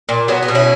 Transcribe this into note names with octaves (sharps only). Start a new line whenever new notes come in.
A#2
F#3 B3
B3
B2
C#4 E4